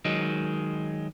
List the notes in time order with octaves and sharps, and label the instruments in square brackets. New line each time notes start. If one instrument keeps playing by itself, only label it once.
[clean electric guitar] D#3 F#3 G#3